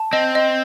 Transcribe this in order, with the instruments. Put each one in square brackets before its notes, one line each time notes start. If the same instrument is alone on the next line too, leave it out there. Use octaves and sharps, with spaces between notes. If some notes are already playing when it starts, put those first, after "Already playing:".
Already playing: [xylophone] A5
[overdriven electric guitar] C4 [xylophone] D#5
[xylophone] D#5